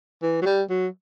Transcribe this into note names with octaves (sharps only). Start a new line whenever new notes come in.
E3
F#3
G3
F#3